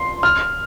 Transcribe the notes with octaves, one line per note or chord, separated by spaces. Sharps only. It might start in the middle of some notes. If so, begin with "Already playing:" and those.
Already playing: C6
F6